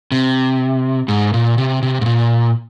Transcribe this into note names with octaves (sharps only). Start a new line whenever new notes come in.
C3
G#2
A#2
C3
C3
G#2
A#2